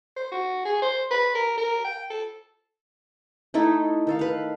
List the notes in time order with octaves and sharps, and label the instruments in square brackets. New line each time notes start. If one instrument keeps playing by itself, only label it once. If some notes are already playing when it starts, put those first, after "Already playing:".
[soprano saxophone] C5
F#4
G#4
C5
B4
A#4
A#4
G5
A4
[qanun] A3 D#4 E4 A4
D#3 A4 F5
B4 F5